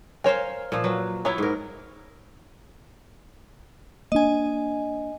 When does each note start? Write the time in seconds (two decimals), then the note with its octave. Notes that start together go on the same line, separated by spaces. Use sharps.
0.24 A#4 C5 C#5 F5 G#5
0.72 A#2 F3
0.84 F#3 B4
1.25 F#3 B3 E4 C#5 A#5
1.38 G#2 A#4
4.12 A#3 D4 D#5 G#5